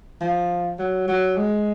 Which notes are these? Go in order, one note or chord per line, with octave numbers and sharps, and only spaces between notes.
F3
F#3
F#3
G#3